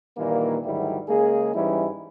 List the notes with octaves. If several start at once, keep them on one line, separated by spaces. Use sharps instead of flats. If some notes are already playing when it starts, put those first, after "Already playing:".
G2 A#2 D#3 E3 A#3
D2 G#2 D#3 F#3 G3 E4
C#3 G#3 A#3 G#4
G#2 E3 G3 C#4 D#4 E4